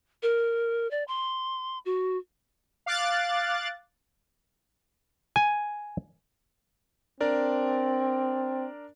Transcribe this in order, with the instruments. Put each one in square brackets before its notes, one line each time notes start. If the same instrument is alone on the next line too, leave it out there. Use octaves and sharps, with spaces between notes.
[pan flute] A#4
D5
C6
F#4
[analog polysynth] F5 D6 F#6 A6
[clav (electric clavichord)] G#5
[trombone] C4 [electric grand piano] D4 A#4 D5